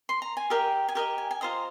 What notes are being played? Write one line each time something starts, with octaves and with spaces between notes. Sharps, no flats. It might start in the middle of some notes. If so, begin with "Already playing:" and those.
C6
A#5
G#5
G4 A#4 D#5 G5
G#5
G4 A#4 D#5 G5
G#5
G#5
F4 C5 D#5 A#5